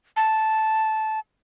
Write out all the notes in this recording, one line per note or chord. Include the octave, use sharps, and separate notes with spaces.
A5